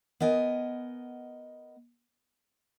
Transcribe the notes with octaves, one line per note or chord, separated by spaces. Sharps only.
B3 A#4 D#5 G#5